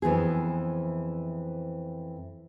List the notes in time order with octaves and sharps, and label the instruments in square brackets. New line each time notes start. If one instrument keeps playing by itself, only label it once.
[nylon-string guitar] F2 E3 B3 G#4